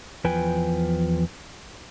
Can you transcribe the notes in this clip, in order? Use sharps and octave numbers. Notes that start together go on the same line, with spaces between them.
E2 F3 B4 G5 G#5